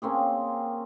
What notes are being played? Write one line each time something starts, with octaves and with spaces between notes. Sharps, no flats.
A#3 C4 C#4 G#4